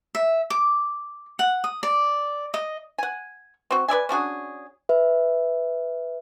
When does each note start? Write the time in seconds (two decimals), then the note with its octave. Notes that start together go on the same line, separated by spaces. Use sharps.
0.15 E5
0.50 D6
1.39 F#5
1.64 D#6
1.83 D5
2.54 D#5
2.98 F#5 G#5
3.71 C4 F#4
3.88 B4 D5 E5 G#5
4.09 C#4 D4 F#4 G#4
4.89 B4 E5